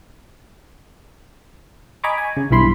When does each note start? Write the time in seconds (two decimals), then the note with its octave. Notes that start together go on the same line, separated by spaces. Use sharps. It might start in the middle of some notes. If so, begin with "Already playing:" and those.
2.04 D#5 G#5 A#5 B5 C#6 D6
2.18 G#5
2.37 C#3
2.50 B1 G2 E3 B5 C6